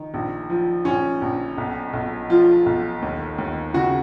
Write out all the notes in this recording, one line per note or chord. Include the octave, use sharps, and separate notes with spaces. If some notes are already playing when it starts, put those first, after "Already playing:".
Already playing: D#3
A#1
F3
A#1 C#4
A#1
B1
B1
F3 F4
B1
D#2
D#2
C#3 F#4